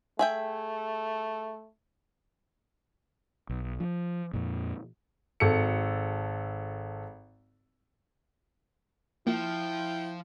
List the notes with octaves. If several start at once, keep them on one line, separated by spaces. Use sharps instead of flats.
A3 G#4 E5 G5
B1
F3
F2 A#2
G#1 A4 C#7
F3 A#3 E4 F4 E5 G5